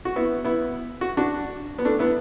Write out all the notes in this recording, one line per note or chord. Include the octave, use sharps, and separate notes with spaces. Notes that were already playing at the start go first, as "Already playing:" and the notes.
F#4
B3 E4
B3 E4
F#4
D4 F#4
B3
A3 D4
B3 E4